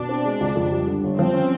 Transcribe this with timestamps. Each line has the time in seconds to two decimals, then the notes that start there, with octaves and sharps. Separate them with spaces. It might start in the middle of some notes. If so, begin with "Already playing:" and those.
Already playing: B2 D4
0.09 C4
0.25 G#3
0.41 C#2
0.56 F2
0.72 G3
0.87 D3
1.04 G1
1.19 F3 C4
1.34 C#4